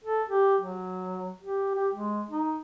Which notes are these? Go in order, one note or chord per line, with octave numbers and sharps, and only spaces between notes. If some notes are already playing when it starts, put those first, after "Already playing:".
A4
G4
F#3
G4
G4
G#3
D#4